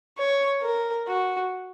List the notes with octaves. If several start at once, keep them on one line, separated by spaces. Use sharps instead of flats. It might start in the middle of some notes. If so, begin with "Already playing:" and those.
C#5
A#4
F#4